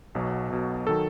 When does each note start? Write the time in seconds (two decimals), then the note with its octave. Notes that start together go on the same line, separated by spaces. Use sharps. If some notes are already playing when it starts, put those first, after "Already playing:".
0.15 B1 B2 F#3
0.50 B1 B2 F#3
0.87 D#3 F#3 A4